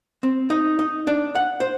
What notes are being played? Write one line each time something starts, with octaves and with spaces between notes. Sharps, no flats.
C4
D#4
D#4
D4
F#5
C5